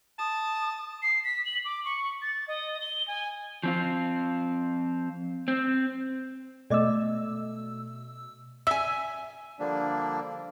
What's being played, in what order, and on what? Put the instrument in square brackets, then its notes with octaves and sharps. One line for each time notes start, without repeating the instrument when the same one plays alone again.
[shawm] A5 [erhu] D#6
[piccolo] C7
B6
F#7
D6
C#6
A6
D#5
G7
G#5
[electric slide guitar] F3 C4 F4
C4
[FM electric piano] B2 E6 [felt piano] A3 [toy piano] D5 D#5 D6
[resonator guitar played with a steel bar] E5 G#5 [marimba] E6
[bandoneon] D3 F3 G3 A#3 D4